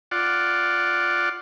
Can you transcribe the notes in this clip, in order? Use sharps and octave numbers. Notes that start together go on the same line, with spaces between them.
F4 D5 F#5